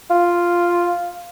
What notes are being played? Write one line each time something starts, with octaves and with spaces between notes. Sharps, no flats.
F4